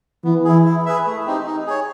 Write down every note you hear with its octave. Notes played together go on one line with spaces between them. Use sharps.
E3 B3
E4 G#4
E4
G#4 B4 E5
A3
C4 D#4 G4
D#4
G#4 C#5